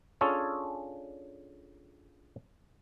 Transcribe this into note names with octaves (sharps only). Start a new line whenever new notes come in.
C#4 D4 F4 G#4 A4 C#5